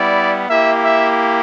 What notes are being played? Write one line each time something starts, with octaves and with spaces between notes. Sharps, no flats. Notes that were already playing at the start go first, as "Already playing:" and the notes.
Already playing: G3 B3 E4 D5
A#3 E4 G4 E5
E5